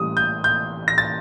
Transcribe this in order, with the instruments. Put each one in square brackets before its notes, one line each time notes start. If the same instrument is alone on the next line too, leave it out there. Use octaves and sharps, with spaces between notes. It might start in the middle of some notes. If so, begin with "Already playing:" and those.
Already playing: [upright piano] A1 A2 G3 [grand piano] D#6
[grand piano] G6
G6
A#6
A6